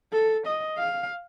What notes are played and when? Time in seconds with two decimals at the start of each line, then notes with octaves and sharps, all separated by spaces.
0.12 A4
0.47 D#5
0.78 F5